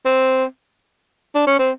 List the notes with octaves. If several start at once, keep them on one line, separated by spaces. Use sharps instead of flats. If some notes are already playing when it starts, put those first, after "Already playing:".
C4
D4
C#4
C4